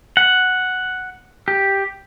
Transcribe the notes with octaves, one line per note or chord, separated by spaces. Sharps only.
F#5
G4